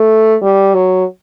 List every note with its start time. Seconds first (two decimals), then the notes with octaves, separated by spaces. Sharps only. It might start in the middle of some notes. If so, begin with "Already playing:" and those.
Already playing: A3
0.42 G3
0.74 F#3